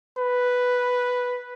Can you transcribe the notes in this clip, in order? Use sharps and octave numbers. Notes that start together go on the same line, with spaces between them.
B4